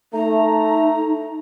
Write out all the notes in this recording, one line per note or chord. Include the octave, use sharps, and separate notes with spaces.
A3 D#4 A#5